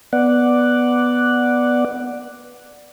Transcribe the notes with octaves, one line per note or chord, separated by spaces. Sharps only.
B3 D5 F#5